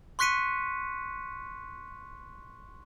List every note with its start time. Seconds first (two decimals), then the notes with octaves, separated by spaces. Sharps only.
0.19 C6 C#6 F#6 B6 C#7 D#7